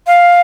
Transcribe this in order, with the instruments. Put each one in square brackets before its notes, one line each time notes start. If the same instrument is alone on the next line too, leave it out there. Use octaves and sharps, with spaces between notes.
[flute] F5